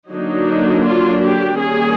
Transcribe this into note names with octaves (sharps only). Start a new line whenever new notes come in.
D3 F#3 A#3 D4 D#4
F4
G4
D#3 G3 A#3 C#4 G#4